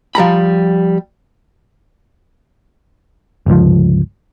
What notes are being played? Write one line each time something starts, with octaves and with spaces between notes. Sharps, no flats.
F3 G3 A#5 B5
G1 C#2 F3